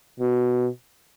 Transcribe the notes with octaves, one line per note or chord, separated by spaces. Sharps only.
B2